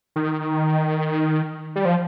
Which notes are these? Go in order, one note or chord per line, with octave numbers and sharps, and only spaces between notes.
D#3
G3
F3